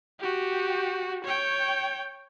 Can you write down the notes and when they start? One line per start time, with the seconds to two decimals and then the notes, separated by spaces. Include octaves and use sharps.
0.20 F#4 G4
1.24 C#5 G5